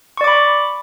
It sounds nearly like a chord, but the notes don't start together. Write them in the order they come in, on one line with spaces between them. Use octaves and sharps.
C#6 D5 D6 B5